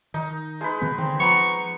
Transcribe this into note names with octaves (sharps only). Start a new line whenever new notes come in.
D#3 D#4
G#3 D#4 B4
B2 D#3 B3
D3 D#3 C4
F3 B3 A#5 C#6